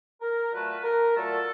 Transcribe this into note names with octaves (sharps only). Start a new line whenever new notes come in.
A#4
A#2 F#3 A3 B4
A#4
A#2 F#3 A3 A4